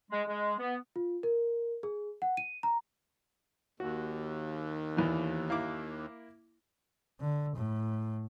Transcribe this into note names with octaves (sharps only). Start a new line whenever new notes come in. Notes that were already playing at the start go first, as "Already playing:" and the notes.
G#3
G#3
B3
F4
A#4
G#4
F#5
D#7
A#5
D#2 F#4
E2 E3
A#3 E4 D6
D3
A2